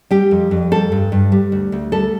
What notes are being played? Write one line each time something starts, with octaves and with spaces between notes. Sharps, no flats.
G3 G4
F2
F2
G3 A4
G2
G2
G3
D2
D2
G3 A4